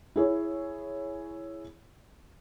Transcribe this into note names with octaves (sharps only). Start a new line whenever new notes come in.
E4 G#4 C#5